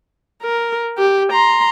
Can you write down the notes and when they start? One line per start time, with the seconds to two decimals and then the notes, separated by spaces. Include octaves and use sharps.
0.42 A#4
0.98 G4
1.32 A#5 C6